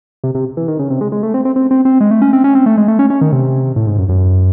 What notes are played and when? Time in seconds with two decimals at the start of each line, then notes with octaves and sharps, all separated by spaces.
0.24 C3
0.35 C3
0.57 E3
0.68 D#3
0.79 C#3
0.90 C3
1.01 G#3
1.12 G#3
1.23 A3
1.34 C4
1.45 C4
1.56 C4
1.71 C4
1.85 C4
2.01 G#3
2.11 A3
2.22 C#4
2.33 C4
2.44 C#4
2.55 C4
2.66 A3
2.77 G#3
2.88 A3
2.99 C#4
3.10 C#4
3.21 D#3
3.32 C3
3.76 A2
3.87 G#2
3.98 F#2
4.09 F#2